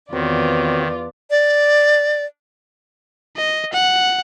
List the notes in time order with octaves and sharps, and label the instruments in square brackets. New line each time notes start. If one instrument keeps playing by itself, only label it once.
[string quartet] E2 F4 D5 [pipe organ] D#3 [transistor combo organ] C4 F#4 C#5 [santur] B4
[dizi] D5
[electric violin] D#5
F#5